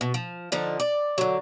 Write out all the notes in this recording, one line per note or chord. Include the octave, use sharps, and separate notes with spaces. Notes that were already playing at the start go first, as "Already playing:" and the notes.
B2
F3
D3 F3 D#4
D5
D3 F#3